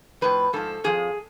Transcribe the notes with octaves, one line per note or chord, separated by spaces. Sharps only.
A2 F3 B4
G#2 F3 A4
F2 F3 G#4